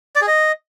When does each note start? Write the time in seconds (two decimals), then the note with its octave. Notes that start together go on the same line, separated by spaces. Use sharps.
0.16 D5
0.22 G#4
0.27 D#5